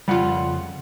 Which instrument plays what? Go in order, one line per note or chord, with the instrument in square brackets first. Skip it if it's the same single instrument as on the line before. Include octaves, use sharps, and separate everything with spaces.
[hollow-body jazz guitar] F2 C#3 F#5 [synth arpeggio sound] G3 F4